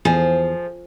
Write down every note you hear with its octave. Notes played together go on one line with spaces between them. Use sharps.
E2 F3 G#4